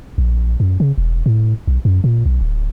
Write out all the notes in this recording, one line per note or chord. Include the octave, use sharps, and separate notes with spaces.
A#1
F#2
C#3
E1
A2
B1
F#2
A#2
B1
D1